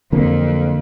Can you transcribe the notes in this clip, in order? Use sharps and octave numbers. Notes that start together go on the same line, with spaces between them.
F2 D3 F#3 A#3